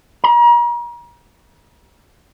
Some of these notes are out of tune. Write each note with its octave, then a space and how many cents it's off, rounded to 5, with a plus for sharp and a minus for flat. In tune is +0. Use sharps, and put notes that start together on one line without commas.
A#5 +40